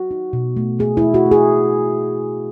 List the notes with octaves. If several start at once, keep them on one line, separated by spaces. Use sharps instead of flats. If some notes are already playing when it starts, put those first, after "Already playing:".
Already playing: F#4
D#4
B2
A3
A3 G#4
E4
A3
F#4
A3
G#4